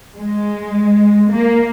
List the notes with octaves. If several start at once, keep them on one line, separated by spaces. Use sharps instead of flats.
G#3
A#3